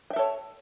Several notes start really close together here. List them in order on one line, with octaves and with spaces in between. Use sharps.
G5 E5 A4 C#5